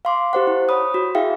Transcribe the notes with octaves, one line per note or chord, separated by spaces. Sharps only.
F5 C6 D6
G4 C5 F#5
E4
C#5 B5 D#6
F#4
E4 G#4 E5 F5 G5